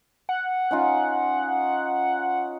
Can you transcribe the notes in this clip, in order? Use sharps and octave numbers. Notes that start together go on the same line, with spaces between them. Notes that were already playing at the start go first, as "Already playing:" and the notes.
F#5
C#4 D#4 F4